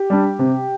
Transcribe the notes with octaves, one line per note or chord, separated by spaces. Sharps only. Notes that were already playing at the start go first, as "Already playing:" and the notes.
Already playing: G4
G3 D4
C3